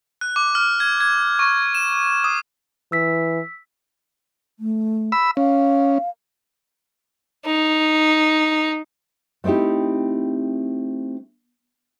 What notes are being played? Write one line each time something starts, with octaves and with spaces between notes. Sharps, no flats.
F#6
D6
F6
G#6
G#6
C#6
E7
D#6
E3 E6 B6
A3
B5 E6
C#4 F5
D#4
A3 C4 D#4 E4 G4